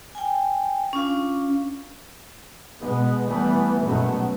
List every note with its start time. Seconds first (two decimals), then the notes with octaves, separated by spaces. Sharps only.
0.15 G5 G#5
0.93 C#4 D4 F4 F5
2.80 B2 G#3 B3
3.26 E3 G3 A3 B3
3.82 F#2 B2 F#3 G#3 A3 B3